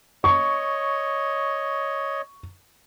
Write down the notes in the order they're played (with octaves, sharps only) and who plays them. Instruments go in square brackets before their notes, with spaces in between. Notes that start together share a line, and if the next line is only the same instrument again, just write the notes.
[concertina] C#5 D#5 [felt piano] C#6